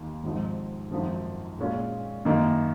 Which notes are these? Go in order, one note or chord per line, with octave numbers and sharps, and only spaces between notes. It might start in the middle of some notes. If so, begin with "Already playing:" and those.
Already playing: D#2 D#3 A#3
G#1 G#2 F3
G#1 F#2 F3
A#2 G#3 C#4 F4
F#2 D#3 A#3 D#4